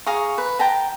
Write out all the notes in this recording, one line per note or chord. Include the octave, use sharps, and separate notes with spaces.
G#4 F5 A#5 C#6
B4
G5 A5 A#5